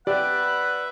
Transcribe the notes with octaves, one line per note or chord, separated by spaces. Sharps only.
G4 B4 D5 E5 F#5